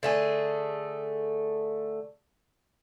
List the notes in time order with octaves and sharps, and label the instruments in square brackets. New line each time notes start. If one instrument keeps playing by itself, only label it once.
[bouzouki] D3 A3 G#4